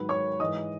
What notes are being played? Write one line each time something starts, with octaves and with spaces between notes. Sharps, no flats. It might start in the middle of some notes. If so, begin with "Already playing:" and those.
Already playing: G#2 D#3 F#3 B4
C#5 C#6
G#2 E3 D#5 D#6